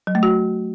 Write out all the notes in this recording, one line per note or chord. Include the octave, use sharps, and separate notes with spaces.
F#3
A3
F#4